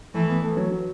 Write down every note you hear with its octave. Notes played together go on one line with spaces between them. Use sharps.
E3 A3
B3
A3
F#3
F#3